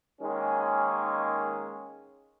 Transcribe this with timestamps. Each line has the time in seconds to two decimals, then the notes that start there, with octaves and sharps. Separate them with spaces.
0.21 D#3 G#3 A#3 C#4